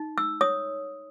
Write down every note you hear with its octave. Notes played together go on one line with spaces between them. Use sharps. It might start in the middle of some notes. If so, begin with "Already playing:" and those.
Already playing: D#4
E6
C#5 D#6